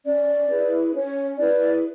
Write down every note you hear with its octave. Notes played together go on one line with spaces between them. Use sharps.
C#4 D5
E4 G#4 B4
C#4 C#5
E4 G#4 B4 D5